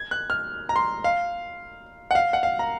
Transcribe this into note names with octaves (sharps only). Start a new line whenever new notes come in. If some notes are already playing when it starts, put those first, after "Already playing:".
Already playing: G#6
F#6
F6
A#5
C6
F5
F#5
F5
F#5
F5
A#5